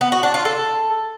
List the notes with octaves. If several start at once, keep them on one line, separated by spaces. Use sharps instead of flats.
B3
F#4
D4
F4
A4